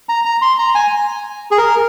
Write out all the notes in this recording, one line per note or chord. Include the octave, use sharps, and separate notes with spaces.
A#5
A#5
C6
A#5
G#5
G#4
A#4